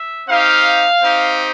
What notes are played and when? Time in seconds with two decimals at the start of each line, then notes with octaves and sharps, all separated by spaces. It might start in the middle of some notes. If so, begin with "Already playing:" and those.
Already playing: E5
0.28 C4 D#4 G4 F5
1.03 C4 D#4 G4